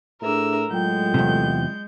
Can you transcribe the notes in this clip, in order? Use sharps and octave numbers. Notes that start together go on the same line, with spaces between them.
A2 D4 G#4 A#4 E5 E6
A2 F#3 G#3 F4 G5 G6
E2 C3